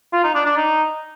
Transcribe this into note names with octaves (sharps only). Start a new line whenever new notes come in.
F4
D#4
D4
D4
D#4